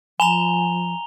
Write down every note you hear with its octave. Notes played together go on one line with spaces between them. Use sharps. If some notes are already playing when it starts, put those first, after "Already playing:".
F3 G#5 A#5 F7 G7